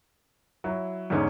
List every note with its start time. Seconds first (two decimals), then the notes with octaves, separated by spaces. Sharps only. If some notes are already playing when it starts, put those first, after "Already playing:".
0.64 F#3 E4
1.10 E2 G#2 D3 C#4 D#4